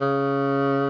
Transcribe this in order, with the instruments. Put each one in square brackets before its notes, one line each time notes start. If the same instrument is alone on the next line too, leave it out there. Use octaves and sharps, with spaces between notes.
[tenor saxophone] C#3